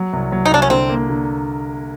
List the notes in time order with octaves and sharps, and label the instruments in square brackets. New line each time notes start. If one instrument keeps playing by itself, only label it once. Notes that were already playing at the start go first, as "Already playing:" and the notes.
Already playing: [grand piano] F#3
C2
F#3
[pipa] D#4
[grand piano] C2 [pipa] D4
[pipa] C#4
[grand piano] D3 [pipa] C4
[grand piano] A#3
D3